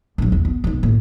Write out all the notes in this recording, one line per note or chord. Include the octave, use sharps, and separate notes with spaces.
A#1 F#3
E2
B3
B1 C3
A2 A#3